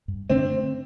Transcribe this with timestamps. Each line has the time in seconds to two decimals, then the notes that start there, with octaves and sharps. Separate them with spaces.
0.08 G2
0.30 D3 A3 C4 D4